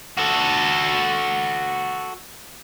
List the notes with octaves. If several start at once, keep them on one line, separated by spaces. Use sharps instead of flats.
F#4 A4